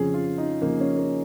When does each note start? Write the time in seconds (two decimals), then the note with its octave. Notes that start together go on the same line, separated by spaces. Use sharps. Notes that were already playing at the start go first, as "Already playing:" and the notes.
Already playing: F2 C#3 F3 G#4
0.14 F4
0.38 D#4
0.61 F2 C#3 F3 A#3
0.80 C#4
0.97 A#3